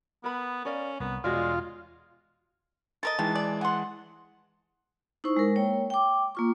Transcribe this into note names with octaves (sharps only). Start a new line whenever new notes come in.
B3 A#4 B5
C#4 A#4 D5 F5
C2 B3 A#4
E2 B2 G#3 C#4 F4 F#4 D5
A4 A#4 D#5 A6
D#3 E3 G#3 A5
D5
F#5 G#5 C6
D#4 E4 C5 C#6
G#3 A#4
A#3 C#5 G5
G5 D6
A#3 F4 C#6